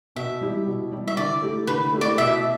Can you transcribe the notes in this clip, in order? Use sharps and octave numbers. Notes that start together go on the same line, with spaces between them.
B2 E5
G3 E4 G4
B2
G3 E4 G4
E5
D3 D5
A3 E4 G4
D3 B4
A3 E4 G4
D5
B2 E5